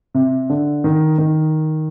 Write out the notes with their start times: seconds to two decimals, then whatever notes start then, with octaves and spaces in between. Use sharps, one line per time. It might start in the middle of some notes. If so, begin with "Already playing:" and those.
0.14 C3
0.50 D3
0.84 D#3
1.18 D#3